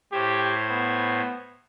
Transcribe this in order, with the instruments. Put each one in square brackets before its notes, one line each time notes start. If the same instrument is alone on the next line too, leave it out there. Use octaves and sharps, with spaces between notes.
[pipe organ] A2 C5 G#6 [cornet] G4
[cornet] B3